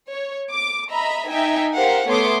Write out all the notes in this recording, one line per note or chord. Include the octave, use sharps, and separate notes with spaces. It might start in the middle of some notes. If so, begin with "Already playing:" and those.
C#5
D6
D#5 E5 A#5 B5
D#4 E5 G5 G#5
G4 A#4 C5 F5 F#5
A3 B3 C#5 C6 D6 D#6